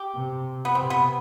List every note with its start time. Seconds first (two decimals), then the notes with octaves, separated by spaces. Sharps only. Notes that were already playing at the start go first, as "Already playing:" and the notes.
Already playing: G4
0.14 C3
0.65 B3
0.75 C3 C4
0.90 B3